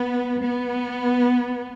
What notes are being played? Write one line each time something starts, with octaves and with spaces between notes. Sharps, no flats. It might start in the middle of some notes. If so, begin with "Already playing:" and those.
Already playing: B3
B3